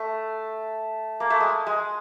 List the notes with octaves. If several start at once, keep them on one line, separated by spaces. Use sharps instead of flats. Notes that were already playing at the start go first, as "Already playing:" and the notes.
Already playing: A3
A#3
A3
G#3
G#3